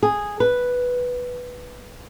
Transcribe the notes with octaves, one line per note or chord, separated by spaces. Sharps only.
G#4
B4